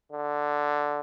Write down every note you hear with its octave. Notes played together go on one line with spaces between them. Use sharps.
D3